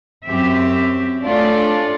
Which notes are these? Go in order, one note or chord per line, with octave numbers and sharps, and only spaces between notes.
F#2 C4 G4 E5
A3 C#4 D4 F4 A4 D5